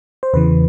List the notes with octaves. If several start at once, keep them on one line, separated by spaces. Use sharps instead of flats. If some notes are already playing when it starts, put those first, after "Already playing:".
C5
E2 C#3 E3 B4